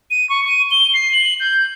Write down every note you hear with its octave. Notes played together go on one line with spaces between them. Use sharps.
D#7
C#6
D#7
G7
C7
F#7
G6